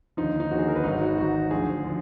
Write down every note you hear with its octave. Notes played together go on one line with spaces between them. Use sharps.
D#2 D3 F3 D#4
D#4
D#2 D3 F3 F#4
G#4
A#4
B4
G#1 G#2 F#3 D#4
F#4
G#1 G#2 F#3 F#4
D2 D3 F3 G#4
D3 F3